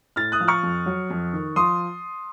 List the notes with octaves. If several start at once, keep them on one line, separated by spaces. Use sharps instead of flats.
A2 F6 A6
D#6 F#6
F3
C#6 F6
F2
F#3
F2
D#3
F3 C6 D#6